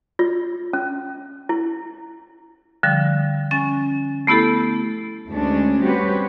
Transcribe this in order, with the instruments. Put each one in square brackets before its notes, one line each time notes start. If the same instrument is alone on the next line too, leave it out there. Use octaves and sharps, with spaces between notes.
[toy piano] F4
C#4
E4
[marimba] D3 F3 G3
C#4 G#5 A6
A3 B3 E4 G4 A4
[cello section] D2 G#3 C#4 D4
G3 C4 F#4 G4 B4 C#5